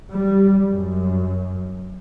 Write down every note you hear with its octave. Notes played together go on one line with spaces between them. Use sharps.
G3
F#2